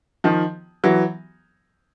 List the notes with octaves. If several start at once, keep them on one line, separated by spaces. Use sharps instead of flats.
D#3 F3
E3 F#3